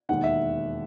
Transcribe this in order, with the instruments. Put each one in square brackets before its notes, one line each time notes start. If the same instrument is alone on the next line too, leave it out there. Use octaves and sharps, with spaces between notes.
[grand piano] E1 D#2 D#3 F#5
E5